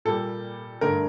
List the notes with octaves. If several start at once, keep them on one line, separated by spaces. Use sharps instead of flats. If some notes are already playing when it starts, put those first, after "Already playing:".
A#2 G3 A#3 A4
G2 D3 A3 A#4